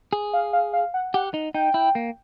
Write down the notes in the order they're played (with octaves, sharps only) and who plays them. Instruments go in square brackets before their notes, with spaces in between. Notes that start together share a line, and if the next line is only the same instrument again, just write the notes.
[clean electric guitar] G#4
[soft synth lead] F5
F5
F5
F#5
[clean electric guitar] G4 [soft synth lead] F#5
[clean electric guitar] D#4
[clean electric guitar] D#4 [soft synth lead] G5
[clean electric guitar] E4
A#3